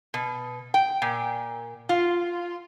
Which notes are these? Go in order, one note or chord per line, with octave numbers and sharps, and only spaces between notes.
B2
G5
A#2
F4